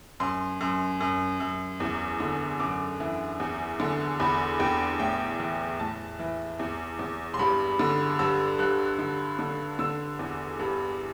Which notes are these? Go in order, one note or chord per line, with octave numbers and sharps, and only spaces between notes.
F#2 C6
F#2
F#2
F#2
E2
D3
F#2 D6
E3
E2
D3
E2 B5
E2 G5
A2 G5
E3
A2 A5
E3
E2
E2
C6
G2 B5
D3
G2 E6
G2 F#6
D3
D3
D3 E6
E2
G2